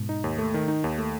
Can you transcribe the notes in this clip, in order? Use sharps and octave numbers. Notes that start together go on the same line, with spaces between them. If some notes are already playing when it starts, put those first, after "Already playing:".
Already playing: G#2 B2
D#4
D#2
A3
D#3
D#4
D#2
A3